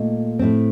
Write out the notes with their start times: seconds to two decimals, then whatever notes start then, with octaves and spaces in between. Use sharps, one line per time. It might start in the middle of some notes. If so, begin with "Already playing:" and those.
Already playing: A#2 A3 D#4
0.39 A2 A3 C4